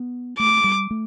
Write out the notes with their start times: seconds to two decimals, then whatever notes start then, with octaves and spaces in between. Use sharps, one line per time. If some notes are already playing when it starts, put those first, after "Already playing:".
Already playing: B3
0.39 A3 D6
0.64 G3
0.91 A3